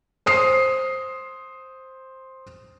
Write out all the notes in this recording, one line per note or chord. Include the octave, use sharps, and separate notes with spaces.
C5 D#6 C7